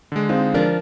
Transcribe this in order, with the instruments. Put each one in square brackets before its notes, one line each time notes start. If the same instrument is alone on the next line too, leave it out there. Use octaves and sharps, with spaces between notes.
[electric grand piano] D3 G#3
[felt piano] C4 D#4 F4
[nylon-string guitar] F3 D4 [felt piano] A#4